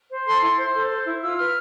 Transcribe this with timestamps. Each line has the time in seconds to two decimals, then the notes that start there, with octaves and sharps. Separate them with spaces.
0.10 C5
0.26 A4 C6
0.41 E4 C6
0.58 C5
0.74 A4
0.90 C5
1.05 E4
1.21 F4 E6
1.36 B4 F6